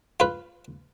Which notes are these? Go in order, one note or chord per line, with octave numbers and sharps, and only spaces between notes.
F4 B4